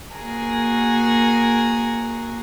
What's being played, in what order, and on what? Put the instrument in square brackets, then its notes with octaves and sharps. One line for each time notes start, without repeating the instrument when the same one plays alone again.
[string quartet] A#3 F#4 G#4 A#4